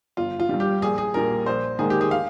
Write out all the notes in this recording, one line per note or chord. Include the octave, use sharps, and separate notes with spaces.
G1 F4
F4
G2 G3
G4
A#1 G#4
G#4
A#2 G3 A#3 A#4
A#1 C5
G#2 D#3 A#3 G#4
G4
G#4
F5